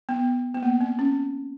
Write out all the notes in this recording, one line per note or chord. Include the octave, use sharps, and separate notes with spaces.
B3
B3
A#3
C4
C#4